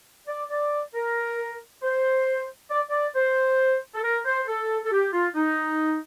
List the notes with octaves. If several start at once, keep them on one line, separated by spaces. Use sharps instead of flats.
D5
D5
A#4
C5
D5
D5
C5
A4
A#4
C5
A4
A4
G4
F4
D#4